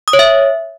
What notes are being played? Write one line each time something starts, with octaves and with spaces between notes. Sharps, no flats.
D#6
C#5
E5